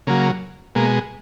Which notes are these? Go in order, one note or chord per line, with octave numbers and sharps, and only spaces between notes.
C#3 F#3 A#3
B2 G#3 A#3